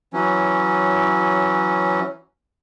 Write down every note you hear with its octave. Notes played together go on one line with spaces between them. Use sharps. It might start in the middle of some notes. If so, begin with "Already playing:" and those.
E3 F#3 C#4